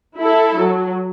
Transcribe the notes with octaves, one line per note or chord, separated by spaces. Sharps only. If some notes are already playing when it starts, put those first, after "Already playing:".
E4 A4
F#3